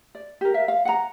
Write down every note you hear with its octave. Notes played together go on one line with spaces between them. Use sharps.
D5
G4 A#4
A#4 E5 F5
F5
F#5 G5 A#5